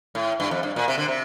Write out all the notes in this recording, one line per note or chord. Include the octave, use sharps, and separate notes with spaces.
A2
G2
F2
G2
A#2
C3
D3
C3